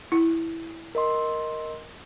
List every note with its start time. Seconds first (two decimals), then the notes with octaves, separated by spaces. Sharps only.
0.12 E4
0.95 A#4 D#5 C6